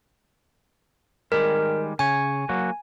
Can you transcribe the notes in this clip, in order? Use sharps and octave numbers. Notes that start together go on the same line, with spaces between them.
D#3 G3 G#3 A#4
C#3 C#5 G#5
F#3 A#3 F#4